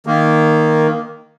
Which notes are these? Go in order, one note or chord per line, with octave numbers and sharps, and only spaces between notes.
D#3 A#3